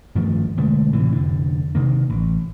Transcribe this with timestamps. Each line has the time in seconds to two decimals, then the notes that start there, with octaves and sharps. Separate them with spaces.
0.15 G2 D#3 F3 A3
0.57 B2 D3 G#3 A3
0.93 A2 C3 E3
1.13 F1 D3
1.75 C3 D#3 A#3
2.10 A1